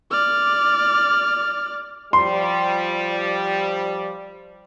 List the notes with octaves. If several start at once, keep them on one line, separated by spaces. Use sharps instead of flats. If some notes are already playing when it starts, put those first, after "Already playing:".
D5 F6
F3 G3 C6